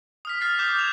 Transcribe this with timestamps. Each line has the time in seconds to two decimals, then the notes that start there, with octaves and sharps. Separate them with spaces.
0.25 D#6 F6 B6
0.41 D#6 F6 F#6 A6 C7
0.59 D6 D#6 G6
0.78 D#6 G#6 E7 F7